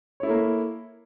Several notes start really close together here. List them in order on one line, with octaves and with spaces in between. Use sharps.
C#5 E4 A4 A#3